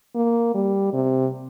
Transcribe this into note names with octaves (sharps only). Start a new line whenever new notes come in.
A#3
G3
C3